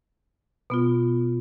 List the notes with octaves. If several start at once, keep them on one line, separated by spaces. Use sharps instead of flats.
B2 B3 F4